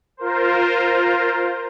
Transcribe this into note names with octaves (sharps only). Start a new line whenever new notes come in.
F4 A#4 C5